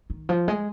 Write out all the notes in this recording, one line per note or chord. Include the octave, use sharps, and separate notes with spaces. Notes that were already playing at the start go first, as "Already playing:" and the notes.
D#3
F3
G#3